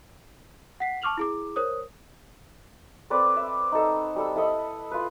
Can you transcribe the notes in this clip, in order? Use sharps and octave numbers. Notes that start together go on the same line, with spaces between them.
F#5 B6 C7
A5 C#6 D6 F6 F7 F#7
E4 G#4 D6
A#4 C5 C#5 D#6
C4 A4 B4 D5
E5
D#4 A4
G3 A4 E6
E4 A4 D#5 B5
F4 B4